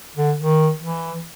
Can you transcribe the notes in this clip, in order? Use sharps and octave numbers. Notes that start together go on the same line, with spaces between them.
D3
D#3
E3